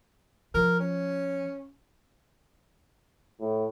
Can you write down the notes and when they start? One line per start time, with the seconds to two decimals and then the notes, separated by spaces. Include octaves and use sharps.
0.54 F3 A#4
0.80 C#4
3.41 A2